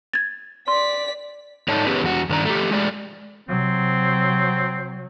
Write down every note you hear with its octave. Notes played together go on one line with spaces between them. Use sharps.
G#6 A6
D5 C6 B6
G#2 D#4 A4 C#5 D5 A5
B3 C#4 G4 G#4 B4
E2 F#4
G2 D#3 D4 D5 A#5
A3 G4
G#3 A3 D5
C3 F#3 C4